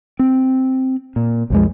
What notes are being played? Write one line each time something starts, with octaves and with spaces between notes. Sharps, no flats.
C4
A#2
B1 F2 G#3